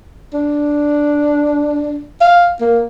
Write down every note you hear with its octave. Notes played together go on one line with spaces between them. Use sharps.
D4
F5
A#3